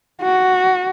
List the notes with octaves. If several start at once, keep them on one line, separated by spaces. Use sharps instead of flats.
F#4